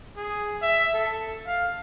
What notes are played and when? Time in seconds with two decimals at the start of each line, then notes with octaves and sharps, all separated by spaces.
0.17 G#4
0.62 E5
0.95 A4
1.47 F5